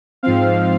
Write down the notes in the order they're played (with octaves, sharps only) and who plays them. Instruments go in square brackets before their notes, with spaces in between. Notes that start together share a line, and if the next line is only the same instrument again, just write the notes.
[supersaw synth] G#2 F3 C4 F5